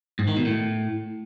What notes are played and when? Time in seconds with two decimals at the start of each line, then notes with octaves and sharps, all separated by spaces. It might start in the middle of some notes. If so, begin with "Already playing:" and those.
0.19 G#2
0.28 D#3
0.37 B2
0.45 A2